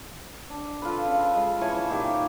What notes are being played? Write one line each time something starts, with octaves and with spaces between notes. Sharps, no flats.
D4
F4 A4 B4
C#3
G#3
E3 C#5 G#5 A5
A#2 D#3 G4